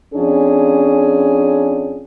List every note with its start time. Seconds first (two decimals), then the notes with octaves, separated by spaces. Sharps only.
0.14 F2 C#4 D4 G#4